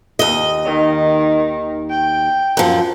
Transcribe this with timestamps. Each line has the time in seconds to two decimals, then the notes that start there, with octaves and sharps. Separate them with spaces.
0.19 D#2 D#5
0.65 D#3
1.90 G5
2.57 F#2 F3